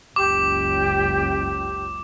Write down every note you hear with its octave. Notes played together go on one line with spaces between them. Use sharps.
F#1 C#2 G4 D6